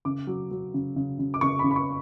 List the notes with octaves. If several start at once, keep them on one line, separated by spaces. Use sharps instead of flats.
C#3 D6
F#3
F#3
C#3
C#3
C#3
D6
C#3 C#6
B5
C#3
B5
C#6